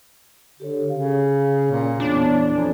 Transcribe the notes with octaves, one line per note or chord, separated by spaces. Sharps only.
D3 G4 A4 C#5
C#3 F5
A#2
E2 B3 D4 C#5
F2 G#5 A#5